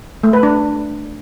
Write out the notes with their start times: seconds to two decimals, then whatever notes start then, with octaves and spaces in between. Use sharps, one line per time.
0.23 A3
0.33 B4
0.43 D4